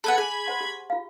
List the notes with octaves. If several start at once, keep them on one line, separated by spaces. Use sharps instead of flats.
A4 B4 F#5 B5 G#6
G#4 G#5
C5 F#5 C6
G4 C#6
F4 F5